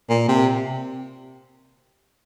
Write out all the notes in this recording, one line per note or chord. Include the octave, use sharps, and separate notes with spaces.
A#2
C3